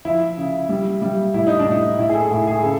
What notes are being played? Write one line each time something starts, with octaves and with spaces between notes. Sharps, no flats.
F3 E4
C#3
G3
G3
A2 E4
D#4
D4
A2 D#4
A2 E4
G#4
A4
A2 G#4
G#4
C#3 A4